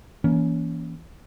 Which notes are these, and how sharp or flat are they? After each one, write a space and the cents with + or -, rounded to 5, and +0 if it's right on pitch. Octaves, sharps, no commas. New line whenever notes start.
E3 +0 A#3 +15 C#4 +20